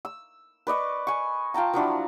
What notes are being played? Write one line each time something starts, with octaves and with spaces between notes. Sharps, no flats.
E6
B4 D5 D#5 C#6
G#5 C#6
F4 G5 A5 A#5
F3 F#3 D4 E4